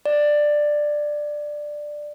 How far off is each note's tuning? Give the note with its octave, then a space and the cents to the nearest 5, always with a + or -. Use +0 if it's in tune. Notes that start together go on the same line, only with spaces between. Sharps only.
D5 +10